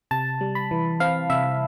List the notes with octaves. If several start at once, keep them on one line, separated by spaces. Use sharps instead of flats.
C3 A5
G3
B5
E3
C4 F5
C3 E5